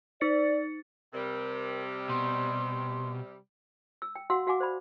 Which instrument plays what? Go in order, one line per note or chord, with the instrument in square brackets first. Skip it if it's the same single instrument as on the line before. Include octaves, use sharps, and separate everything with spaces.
[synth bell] D#4 A6 C#7 [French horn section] D5
[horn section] C3 G3 [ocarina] A#4
[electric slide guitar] B2 [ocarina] C6
[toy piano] E6
G5
F#4 F5 F#5 C6 E6
F#4 F5 F#5 G#5 D6
C5 D5 B5